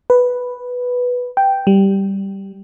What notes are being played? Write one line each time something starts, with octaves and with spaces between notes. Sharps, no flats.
B4
G5
G3